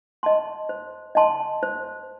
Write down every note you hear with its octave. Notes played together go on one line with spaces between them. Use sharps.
D#5 A5 C6
C5
D#5 A5 C6
C5